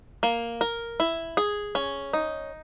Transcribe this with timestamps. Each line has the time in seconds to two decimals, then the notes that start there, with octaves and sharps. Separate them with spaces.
0.23 A#3
0.61 A#4
1.00 E4
1.37 G#4
1.75 C#4
2.13 D#4